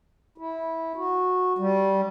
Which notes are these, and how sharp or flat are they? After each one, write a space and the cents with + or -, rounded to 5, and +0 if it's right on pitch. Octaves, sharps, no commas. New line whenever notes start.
E4 -15
F#4 -15
G3 -15